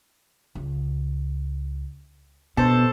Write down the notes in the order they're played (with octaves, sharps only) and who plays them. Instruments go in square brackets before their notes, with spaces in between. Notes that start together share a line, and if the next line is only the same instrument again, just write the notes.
[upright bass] C#2
[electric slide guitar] B2 [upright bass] D4 [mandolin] A4 C5